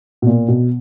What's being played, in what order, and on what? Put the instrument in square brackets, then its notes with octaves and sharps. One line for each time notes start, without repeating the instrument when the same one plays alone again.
[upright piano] B2
A#2
B2